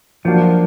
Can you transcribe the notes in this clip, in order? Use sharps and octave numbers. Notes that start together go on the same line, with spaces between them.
F3 F#3 A#3 D4 F#4